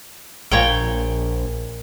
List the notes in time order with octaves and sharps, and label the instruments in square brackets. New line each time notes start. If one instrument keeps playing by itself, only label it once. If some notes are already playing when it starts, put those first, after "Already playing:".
[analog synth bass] A#1 [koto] A#2 C#5 G5